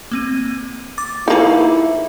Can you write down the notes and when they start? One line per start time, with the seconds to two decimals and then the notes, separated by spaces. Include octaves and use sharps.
0.11 A#3 C4 D#7
0.98 D6 A6
1.28 F3 A#3 D#4 E4 G#4 B4